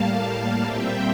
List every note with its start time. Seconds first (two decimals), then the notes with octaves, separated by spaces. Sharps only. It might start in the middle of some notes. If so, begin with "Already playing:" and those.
Already playing: A2 G3 A#3 F5 A5
0.62 A#2 G3 C4 E5 G5